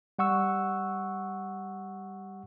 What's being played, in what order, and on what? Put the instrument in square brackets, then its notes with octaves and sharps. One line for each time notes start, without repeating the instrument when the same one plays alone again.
[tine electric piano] G3 F#5 C#6 E6